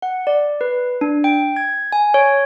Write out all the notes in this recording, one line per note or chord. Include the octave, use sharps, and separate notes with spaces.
F#5
D5
B4
D4
G5
G#6
G#5
C#5